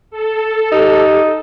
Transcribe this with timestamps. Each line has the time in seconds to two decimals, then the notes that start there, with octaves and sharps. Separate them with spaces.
0.11 A4
0.72 D#4 G4